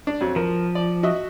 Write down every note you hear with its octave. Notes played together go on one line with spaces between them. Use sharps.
D4
F2 F#3
F3 A#4
D5
F#4 D#5 E5